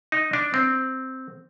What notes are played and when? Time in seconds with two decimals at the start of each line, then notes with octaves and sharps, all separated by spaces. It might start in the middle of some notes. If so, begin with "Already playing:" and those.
0.12 D#4
0.33 D4
0.54 C4